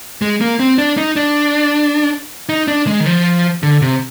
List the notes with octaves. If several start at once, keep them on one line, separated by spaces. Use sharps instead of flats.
G#3
A#3
C4
D4
D#4
D4
D#4
D4
G#3
D#3
F3
D3
C3